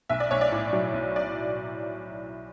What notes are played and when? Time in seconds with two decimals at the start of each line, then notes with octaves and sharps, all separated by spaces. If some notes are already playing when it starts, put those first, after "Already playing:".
0.10 B1 E5
0.20 D5
0.31 B1 C#5
0.41 D5
0.52 A2
0.73 F#3
0.94 B1
1.16 D5